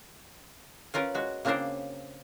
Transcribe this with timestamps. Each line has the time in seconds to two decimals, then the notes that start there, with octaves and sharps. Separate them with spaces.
0.94 C#4 F4 A#4 B4
1.15 G#3 F#4
1.45 C#3 A#3 C4 D4 A#4 C5